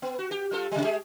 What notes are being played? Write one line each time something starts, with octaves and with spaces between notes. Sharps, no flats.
B3
F#4
G4
G3 F4 A4
C3 G3
G#3 G4 G#4